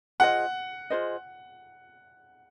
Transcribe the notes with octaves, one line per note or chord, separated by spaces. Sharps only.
F4 G#4 C5 D#5 F#5
F4 G#4 C5 D#5